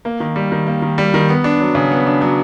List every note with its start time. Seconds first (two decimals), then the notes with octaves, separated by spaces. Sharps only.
0.05 A#3
0.20 D#3
0.36 G3
0.52 D#3
0.67 A#3
0.82 D#3
0.98 G3
1.14 D#3
1.29 B3
1.44 D4
1.61 F#3
1.75 C#3
1.92 B3
2.06 D4
2.21 F#3